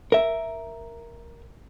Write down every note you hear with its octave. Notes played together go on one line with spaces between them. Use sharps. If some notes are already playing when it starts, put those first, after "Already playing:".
A#4 E5